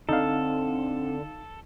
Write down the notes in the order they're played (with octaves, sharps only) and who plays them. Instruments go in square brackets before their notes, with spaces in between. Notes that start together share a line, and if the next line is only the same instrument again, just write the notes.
[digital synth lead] D3 [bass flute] C4 [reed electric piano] D#4 F5 [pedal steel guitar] A4